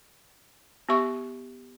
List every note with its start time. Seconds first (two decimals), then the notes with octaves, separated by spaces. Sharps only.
0.89 B3 G4 E5 C#6